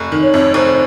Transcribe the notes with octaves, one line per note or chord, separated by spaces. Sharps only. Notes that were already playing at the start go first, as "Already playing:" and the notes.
Already playing: F1
D#3
C#5
F2
F1 C5